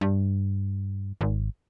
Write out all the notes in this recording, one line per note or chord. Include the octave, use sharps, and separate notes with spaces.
G2
G#1